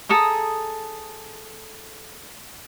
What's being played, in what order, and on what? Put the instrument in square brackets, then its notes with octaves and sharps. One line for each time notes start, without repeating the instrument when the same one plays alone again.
[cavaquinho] G#4 A4 A#5 D#6